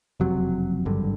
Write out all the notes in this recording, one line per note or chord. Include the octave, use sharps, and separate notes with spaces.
F#1 F2 C3 F#3
G#1 G2 D3